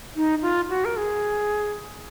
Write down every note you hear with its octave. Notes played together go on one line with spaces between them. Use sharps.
D#4
F4
F#4
A#4
G#4